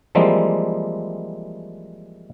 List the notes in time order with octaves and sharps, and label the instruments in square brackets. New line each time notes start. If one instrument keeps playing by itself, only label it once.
[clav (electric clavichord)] E3 F3 G3 G#3 A#3 C4